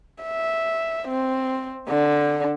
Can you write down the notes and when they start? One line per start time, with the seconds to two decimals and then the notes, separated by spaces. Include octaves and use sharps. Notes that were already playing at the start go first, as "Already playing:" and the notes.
0.23 E5
1.09 C4
1.88 D3